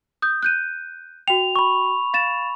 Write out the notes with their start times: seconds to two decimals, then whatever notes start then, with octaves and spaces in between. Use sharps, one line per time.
0.22 D#6 G6
0.43 F#6 G6 D#7
1.28 F#4 G5 F7
1.56 B5 C#6
2.14 F5 A6 E7